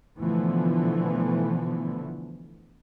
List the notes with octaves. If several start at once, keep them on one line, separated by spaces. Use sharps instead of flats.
B2 D3 E3 F3 A3 B3